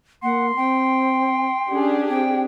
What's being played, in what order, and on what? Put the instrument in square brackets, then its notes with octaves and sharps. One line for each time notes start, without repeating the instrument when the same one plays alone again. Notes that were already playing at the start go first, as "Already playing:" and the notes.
[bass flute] A#3 [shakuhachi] F#5 [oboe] C6
[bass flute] C4 [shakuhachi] G5
[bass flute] C#4 [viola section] D4 G4 G#4
[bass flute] C4 [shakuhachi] G5